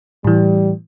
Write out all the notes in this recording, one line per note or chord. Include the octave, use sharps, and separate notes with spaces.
A2 E3 G3